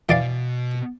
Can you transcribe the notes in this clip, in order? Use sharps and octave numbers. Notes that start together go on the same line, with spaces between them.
B2 E3 D5 F5